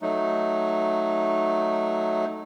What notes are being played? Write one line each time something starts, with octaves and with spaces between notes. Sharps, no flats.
F#3 A3 D#4